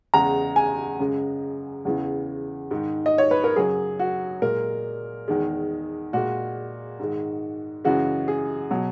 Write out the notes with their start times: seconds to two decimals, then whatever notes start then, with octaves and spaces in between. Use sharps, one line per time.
0.14 E2 C#3 G#3 A#5
0.56 G#5
0.99 F#2 C#3 G#3
1.85 E2 C#3 E3
2.71 G#2 D#3 G#3
3.06 D#5
3.18 C#5
3.31 B4
3.44 A#4
3.56 F#2 C#3 F#3 G#4
3.99 F#4
4.42 A#2 G#3 A#4
5.28 E2 D#3 G#3
6.13 A#2 G#3 F#4
6.99 G#2 D#3 G#3
7.85 F#2 C#3 E3 G#3 F#4
8.28 G#4
8.71 B2 F#3